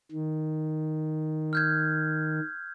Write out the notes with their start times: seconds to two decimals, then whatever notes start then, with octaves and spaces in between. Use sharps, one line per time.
0.12 D#3
1.53 F6 G6 G#6